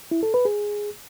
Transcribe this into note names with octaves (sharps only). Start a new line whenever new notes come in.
E4
A4
B4
G#4